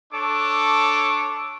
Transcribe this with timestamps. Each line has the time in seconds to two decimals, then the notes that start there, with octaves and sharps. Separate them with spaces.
0.13 D4 A4 C#5 D6